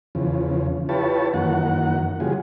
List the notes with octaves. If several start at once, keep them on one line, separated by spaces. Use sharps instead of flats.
E2 C#3 F3
E4 F4 G4 B4 C#5 A5
F#2 D#3 E3 A#3 F#5
C#3 E3 F#3 G3 F4 G#4